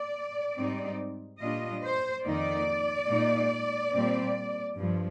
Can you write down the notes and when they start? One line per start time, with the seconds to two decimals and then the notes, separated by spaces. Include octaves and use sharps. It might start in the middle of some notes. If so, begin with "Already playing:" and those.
Already playing: D5
0.56 G#2 G3 C4 D#4
1.41 A#2 G3 D4 F4 D#5
1.84 C5
2.26 F2 D#3 A#3 D#4 D5
3.10 A#2 G#3 D#4
3.95 A#2 G3 C4
4.79 G2 F3